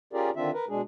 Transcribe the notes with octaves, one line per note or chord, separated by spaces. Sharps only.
C#4 F4 G4 G#4 A#4 D5
D3 D#3 C4 D4 F4 E5
A#4 B4
B2 G#3 D4 G#4